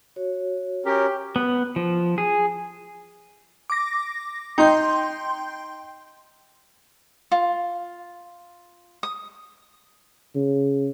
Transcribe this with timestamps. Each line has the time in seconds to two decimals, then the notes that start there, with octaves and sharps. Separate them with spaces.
0.16 F#4 C#5
0.85 C#4 G4 A#4
1.36 B3
1.76 F3
2.18 G#4
3.70 D6 A#6
4.58 D#4 G5 C6 G6
7.32 F4
9.03 D#6
10.35 C#3